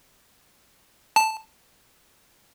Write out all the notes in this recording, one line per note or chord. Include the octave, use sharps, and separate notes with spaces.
A5